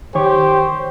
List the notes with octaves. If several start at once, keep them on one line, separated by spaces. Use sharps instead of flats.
D#3 G4 C5 C#5 C#6